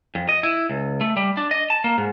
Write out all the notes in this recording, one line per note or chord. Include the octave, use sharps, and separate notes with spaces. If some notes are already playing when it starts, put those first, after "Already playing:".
F2
D#5
E4
C#2
A3
G3
D4
D#5
A5
A#3
G#2